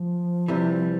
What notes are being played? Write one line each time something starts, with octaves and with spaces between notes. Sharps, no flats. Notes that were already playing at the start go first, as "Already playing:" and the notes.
Already playing: F3
C3 E3 G3